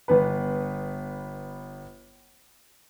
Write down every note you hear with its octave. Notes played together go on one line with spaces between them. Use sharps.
G1 B3 B4